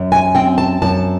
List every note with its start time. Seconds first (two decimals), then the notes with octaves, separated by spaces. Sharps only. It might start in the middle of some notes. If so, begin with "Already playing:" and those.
Already playing: F#2
0.12 G#5
0.35 C4 G5
0.58 A5
0.82 F#2 A5